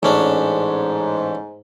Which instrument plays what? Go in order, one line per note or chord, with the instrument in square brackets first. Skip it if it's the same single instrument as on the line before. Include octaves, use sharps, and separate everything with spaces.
[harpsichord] A1 C#4 D4 [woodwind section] G#2